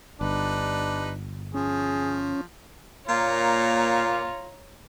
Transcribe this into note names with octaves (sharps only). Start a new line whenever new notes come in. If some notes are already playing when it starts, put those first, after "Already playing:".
G1 G3 D4 D#4 B4
F3 C#4 G#4
A#2 A#3 F4 C#5 A#5